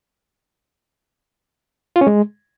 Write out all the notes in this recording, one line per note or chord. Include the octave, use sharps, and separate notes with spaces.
F4
C#4
G#3